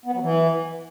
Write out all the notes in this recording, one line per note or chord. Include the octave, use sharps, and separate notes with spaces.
B3
F#3
E3